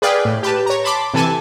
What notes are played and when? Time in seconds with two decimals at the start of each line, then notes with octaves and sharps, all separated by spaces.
0.02 G#4 B4 D5 F5 G5
0.25 A2
0.43 G4 B4 A5
0.66 C#5 A#5
0.84 A5 B5 C6 D6
1.14 C3 E3 A4 G#5 A5